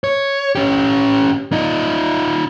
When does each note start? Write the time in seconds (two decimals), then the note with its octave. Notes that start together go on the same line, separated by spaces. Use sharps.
0.04 C#5
0.55 C#4 G4
1.52 D#4 F4